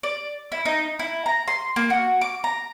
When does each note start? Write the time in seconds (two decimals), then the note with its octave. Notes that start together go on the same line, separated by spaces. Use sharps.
0.03 D5
0.52 E4
0.65 D#4
0.99 E4
1.26 A#5
1.48 C6
1.76 A#3
1.90 F#4
2.21 D6
2.44 A#5